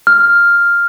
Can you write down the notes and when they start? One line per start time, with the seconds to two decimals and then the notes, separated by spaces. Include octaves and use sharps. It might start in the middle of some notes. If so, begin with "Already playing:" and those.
0.07 F6